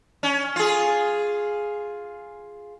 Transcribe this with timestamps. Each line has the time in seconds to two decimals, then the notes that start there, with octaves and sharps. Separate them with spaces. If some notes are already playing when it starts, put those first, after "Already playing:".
0.23 C#4
0.56 F4 G#4